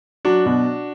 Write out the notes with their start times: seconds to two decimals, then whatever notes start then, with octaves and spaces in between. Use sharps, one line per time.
0.25 F#3 D4 F#4
0.46 B2